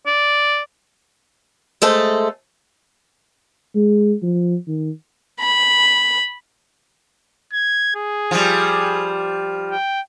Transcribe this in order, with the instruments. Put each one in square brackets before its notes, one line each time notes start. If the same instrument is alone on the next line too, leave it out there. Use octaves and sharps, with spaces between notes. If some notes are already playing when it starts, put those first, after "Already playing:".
[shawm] D5
[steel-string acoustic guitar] G#3 A3 A4 C5
[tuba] G#3
F3
D#3
[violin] B5
[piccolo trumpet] G#6
G#4
[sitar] F3 G3
[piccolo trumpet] G5